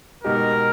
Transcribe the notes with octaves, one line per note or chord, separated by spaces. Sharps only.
B2 G#3 D#4 G4 A#4